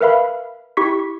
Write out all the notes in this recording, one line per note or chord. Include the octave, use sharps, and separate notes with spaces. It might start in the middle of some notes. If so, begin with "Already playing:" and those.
A#4 B4 E5 F5 B5
E4 G4 C#6 B6